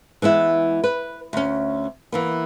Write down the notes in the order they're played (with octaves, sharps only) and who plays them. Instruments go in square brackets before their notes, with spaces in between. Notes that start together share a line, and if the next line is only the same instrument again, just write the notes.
[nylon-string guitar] E3 G#3 B3 E4
B4
D2 C#4
E3 A#3 B3